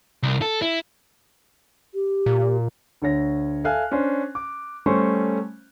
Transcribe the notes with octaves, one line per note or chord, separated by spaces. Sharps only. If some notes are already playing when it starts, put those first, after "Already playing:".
C2
A4
E4
G4
A#2
D2 D3 C#5 A#6
A4 E5 F5 G#5 F6 F#6
C#4 D4 C5
D6
G3 A3 C#4 C5 C#6